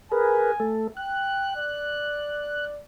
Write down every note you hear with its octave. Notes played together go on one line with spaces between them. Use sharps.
G#4 A#4 B4 G#5
A3 A4
G5 F#6
D5